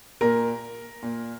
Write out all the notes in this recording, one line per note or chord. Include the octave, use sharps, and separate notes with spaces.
A#2 A#4
A#2